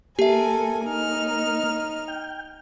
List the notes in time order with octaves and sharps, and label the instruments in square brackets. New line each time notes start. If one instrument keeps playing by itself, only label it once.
[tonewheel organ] A#3 [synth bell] G4 E5 [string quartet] A4 A#4 G#5
[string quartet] D#4 F6
[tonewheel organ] G5